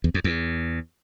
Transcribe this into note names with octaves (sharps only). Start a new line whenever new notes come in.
E2
F2
E2